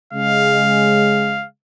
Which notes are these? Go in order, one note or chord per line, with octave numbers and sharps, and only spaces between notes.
C#3 G#3 F5